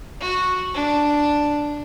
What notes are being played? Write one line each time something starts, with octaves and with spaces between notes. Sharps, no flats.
F#4
D4